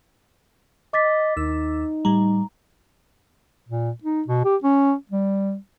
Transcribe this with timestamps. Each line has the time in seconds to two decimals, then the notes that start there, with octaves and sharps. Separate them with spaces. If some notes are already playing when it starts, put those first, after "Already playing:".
0.94 D#5 D6 A6 B6
1.37 D#2 D#4 E6
2.05 A2 G3 A#5
3.69 A#2
4.04 D#4
4.28 B2
4.45 G4
4.64 C#4
5.12 G3